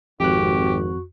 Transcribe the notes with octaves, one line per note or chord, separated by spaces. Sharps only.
G#1 F2 F#4 G4 F#6